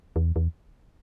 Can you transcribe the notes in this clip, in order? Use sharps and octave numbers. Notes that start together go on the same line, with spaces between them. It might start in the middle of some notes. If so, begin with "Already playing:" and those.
E2
E2